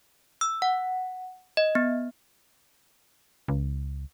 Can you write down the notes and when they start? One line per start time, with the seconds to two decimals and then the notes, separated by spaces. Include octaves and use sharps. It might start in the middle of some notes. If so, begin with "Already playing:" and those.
0.41 E6
0.62 F#5
1.57 D#5
1.75 B3
3.48 C#2